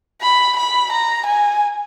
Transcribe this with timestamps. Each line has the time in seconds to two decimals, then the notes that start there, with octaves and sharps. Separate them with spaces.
0.21 B5
0.57 B5
0.92 A#5
1.26 G#5